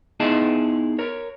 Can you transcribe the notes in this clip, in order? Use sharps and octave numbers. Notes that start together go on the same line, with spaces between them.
B3 D#4 E4 G#4 D#5 A5
A#4 C#5